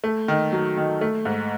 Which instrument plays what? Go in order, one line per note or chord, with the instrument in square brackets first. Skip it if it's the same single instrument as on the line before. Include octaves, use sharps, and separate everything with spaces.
[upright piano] A3
D#3
F#3
D#3
A3
G#2